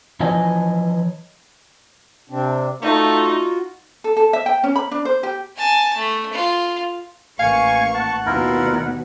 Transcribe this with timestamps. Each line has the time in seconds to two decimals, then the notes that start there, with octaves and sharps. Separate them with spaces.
0.20 E3 F3 C#5 D#5 G#5
2.30 C3 C4 D4
2.82 A3 D#4 F4 F#4
4.04 A4
4.17 A4
4.33 E5
4.46 G5
4.64 C#4
4.76 B5
4.91 D4
5.05 C5
5.23 G4
5.57 G#5 A5
5.97 A3
6.33 F4
7.39 A1 A#3 F5 G#5 C#6
7.94 F#5 A5
8.26 D#2 B2 E4 F4 A#4